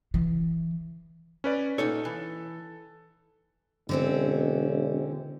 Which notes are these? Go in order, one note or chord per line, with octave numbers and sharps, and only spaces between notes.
E3
C#4 B4 D5
A#2 D#4 A4 C#5
E3
E1 D3 C4 C#4